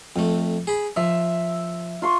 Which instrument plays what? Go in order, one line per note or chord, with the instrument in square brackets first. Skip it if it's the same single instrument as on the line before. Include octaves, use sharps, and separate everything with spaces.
[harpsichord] F2 A3
G#4 B5
[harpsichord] F3 [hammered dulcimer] E5
[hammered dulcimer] F4 C6 C#6